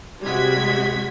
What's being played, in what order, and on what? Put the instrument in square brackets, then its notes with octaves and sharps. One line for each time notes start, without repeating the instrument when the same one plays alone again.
[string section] C3 G3 G#3 F#4 G#6 B6